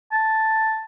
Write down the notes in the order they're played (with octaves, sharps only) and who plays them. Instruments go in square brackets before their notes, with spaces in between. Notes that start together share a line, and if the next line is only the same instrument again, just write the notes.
[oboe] A5